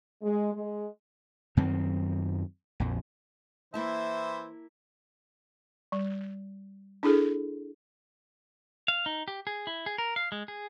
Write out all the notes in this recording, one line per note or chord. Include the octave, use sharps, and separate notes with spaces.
G#3
G#3
F#2 D#3 C4
A#1 F2
E3 A#3 E4 C5 E5 A5
G3
D4 E4 G#4 A4
F5
D#4
G4
G#4
E4
G#4
A#4
F5
G#3
G#4